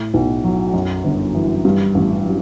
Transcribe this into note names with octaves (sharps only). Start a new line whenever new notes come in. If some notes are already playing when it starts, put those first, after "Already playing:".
Already playing: A2
B1
F#3
F#2
G1
E3
G2
A1
F#3